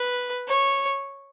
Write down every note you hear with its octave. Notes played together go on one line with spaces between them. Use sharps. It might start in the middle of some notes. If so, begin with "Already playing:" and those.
Already playing: B4
C#5